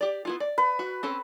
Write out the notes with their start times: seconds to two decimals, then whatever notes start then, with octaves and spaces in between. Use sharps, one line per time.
0.01 G4 D5
0.25 B3 E4 F4
0.40 D5
0.58 B4
0.79 F#4
1.03 C4 C#4 A4